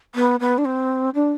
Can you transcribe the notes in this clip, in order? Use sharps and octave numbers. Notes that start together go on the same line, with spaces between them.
B3
B3
D4
C4
D4